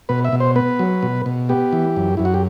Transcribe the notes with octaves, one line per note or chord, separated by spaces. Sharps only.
B2 B4
E5
B2
C5
B3 B4
F#3
B2
B2
B3 G4
E3
F#2
F#2 E4
F#4
G4